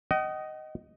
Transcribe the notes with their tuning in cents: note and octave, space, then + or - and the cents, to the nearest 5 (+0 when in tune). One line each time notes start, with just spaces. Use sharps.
D#5 +0 F#5 +45